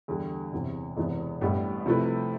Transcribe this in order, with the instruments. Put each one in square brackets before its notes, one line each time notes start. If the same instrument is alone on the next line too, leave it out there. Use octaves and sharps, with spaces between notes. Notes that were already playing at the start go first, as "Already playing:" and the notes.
[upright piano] E2 D3 G3
E1 E2 C3 E3
E1 E2 C3 E3 B3
A1 A2 G3 B3 D4
C3 F3 A3 E4 B4